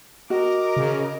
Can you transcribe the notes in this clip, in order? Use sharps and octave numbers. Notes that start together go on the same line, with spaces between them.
F#4 A#4 D#5 D6
C#3